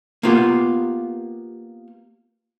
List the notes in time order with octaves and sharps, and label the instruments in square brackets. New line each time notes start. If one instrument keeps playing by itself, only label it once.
[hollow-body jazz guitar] A#3 B3 F4 G4